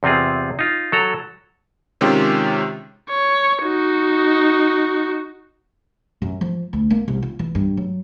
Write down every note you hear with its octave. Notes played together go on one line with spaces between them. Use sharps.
E2 C3 C4 F4 G#4
D#4 F4
F#3 A4 A#5
C3 D#3 G#3 C#4 F4 G4
C#5
D#4 F#4
F#2
F3
D2
A#3
C2
F4
E3
G2
F#3